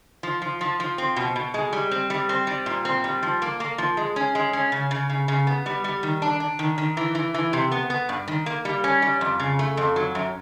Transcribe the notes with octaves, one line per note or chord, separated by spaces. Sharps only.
F3
F3
F3
F3
C4
B2
B2
G#3
G3
C4
G3
C4
G3
A#2
C4
G3
F3
A#3
A#3
F3
G#3
C#4
G#3
C#4
C#3
C#3
C#3
C#3
B3
G3
G3
D#3
D4
D4
D#3
D#3
E3
E3
E3
C3
B3
B3
G2
D#3
A#3
G3
C#4
G3
F2
C#3
A3
F2
F#3
F#2